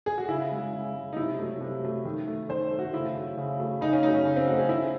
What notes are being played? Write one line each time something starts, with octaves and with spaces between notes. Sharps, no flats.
G#4
F#4
C#3 E4
G#3
C#3
G#3
D#4
C3 E4
F#3 A3
C3
F#3 A3
D#3
A3
D#3 C5
A3
F#4
C#3 E4
F#3 A3
C#3
F#3 A3
C#3 D#4
C#4
F#3 A3 D#4
C#4
C#3
C4
F#3 A3 F#4
G#4
D#3 E4